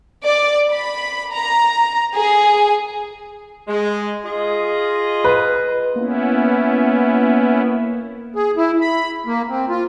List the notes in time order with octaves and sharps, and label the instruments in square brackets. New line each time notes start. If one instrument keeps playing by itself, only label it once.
[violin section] D5
B5
A#5
G#4
[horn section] G#3
F4 G#4 D#5
[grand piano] B4
[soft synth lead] A#3 [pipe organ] B3 C#4 E4
[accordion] G#4
E4
B5
A#3
C4
F4